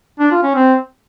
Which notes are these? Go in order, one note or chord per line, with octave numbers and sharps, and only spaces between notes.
D4
F4
C#4
C4